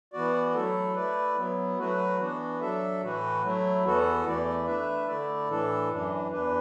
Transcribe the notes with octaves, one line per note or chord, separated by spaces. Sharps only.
E3 B3 F#4 D5
F#3 A3 E4 A4
A3 E4 B4 D5
F#3 B3 E4
F#3 A3 F#4 B4
E3 B3 D4 F#4
F#3 D4 A4 E5
A2 E3 A3 F#4 B4
F#3 A3 E4
E2 E3 B3 F#4 A4
E2 E3 A3 E4 D5
A3 D4 B4 E5
D3 A3 E4 D5
A2 E3 D4 A4
F#2 E3 D4
E2 E3 D4 B4